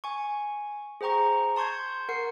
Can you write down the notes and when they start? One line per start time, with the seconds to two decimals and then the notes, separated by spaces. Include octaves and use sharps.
0.04 G#5 C#6
1.01 G#4 C5 G5 A#5 C#6
1.56 A5 C6 C#6 G6 G#6
2.09 A#4 F#5 C7 C#7